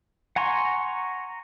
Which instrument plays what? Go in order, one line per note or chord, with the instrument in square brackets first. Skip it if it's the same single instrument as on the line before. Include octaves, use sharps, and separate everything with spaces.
[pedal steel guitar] F#5 G#5 A#5 C6 C#6